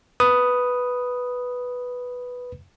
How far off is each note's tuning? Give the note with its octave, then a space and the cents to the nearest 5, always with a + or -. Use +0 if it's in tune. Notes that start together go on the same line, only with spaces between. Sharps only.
B4 +0 D#6 +0